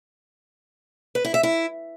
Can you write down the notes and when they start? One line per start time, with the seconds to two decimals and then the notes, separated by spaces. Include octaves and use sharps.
1.15 B4
1.25 E4
1.34 E5
1.43 E4